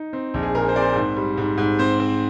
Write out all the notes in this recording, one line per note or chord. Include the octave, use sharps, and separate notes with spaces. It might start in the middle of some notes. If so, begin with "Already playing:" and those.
Already playing: D#4
C4
A#1
G#4
A#2 A#4
C5
C4 D5
C5
G#2
G3
G#2
G#2
C4 C5
C4